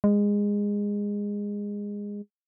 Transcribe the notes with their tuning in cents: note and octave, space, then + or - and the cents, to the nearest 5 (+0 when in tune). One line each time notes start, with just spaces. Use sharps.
G#3 -20